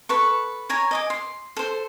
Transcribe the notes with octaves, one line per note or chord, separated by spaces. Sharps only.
A4 B4 C#6
C#5 G#5 A#5
D#5 G#5 D6
C6
A4 C5